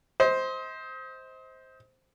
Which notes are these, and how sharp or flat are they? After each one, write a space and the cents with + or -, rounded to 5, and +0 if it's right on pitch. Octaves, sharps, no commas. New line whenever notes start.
C5 +0 D#5 +35